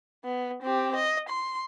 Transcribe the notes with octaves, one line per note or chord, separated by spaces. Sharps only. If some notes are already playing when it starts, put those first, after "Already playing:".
B3
C4 G4
D#5
C6